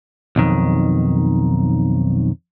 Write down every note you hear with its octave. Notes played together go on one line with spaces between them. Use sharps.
B1 F2 D#3